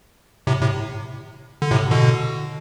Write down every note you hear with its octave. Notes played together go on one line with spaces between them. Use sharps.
A2 C3
A2 C3
D3
A2 C3
B2 D3